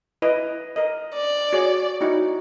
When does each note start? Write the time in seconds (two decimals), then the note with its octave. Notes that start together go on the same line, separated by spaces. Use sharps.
0.22 E4 B4 D#5
0.76 A#4 D#5
1.14 D5
1.53 F#4 G#4 C#5
2.01 D#4 E4 F#4